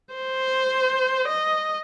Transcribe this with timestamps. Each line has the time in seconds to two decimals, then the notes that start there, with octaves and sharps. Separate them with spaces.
0.14 C5
1.28 D#5